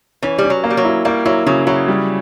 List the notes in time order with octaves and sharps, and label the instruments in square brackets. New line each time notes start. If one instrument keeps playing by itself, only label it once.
[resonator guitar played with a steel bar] E3 [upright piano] C#4
[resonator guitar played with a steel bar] G3
[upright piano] C#4
[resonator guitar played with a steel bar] F#3
[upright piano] A#3
[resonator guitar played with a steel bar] G3
F#3
[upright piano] E4
[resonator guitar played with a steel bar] G3 [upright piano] A#3
[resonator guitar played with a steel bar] F#3 [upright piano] E4
[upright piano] C#3 [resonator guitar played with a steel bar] F#3
[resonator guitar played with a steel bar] F#3 [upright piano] E4
[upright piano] G3